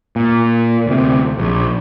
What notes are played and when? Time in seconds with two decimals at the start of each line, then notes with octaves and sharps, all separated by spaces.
0.16 A#2
0.86 D2 C3
1.39 A#1